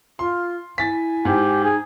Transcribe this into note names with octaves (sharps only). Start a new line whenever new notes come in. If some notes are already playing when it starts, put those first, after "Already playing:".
F4 C6
E4 G#5 A6 B6
G#2 G4
D#4 G#4